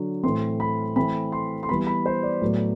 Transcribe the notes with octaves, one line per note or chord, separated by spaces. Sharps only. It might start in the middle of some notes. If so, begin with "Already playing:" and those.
Already playing: D3 F#3
A2 E3 A3 C4 C6
B5
E3 A3 C4 B5
C6
C6
E3 G3 B3 B5
B5
C5
D5
A2 F#3 B3